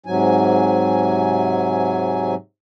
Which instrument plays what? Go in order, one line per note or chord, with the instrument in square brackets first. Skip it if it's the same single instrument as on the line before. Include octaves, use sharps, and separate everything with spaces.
[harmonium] G#2 C3 F#3 G#5